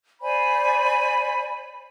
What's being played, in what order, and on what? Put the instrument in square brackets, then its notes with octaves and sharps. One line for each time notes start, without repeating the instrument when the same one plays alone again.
[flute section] C5 D5 G#5 B5